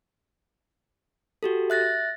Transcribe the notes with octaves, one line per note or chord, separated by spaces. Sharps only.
F#4 G4 A4
E5 F#6 A6 A#6